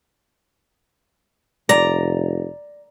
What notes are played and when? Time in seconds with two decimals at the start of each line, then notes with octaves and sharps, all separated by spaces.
1.69 F1 D5 A#5